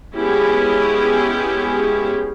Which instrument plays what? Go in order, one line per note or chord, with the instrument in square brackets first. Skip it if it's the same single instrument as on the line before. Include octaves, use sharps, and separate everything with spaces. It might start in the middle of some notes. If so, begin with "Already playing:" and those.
[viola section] G#3 B3 C#4 E4 G4 G#4